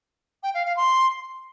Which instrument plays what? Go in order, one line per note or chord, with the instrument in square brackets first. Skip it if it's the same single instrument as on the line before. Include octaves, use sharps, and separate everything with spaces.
[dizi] G5
F5
F5
C6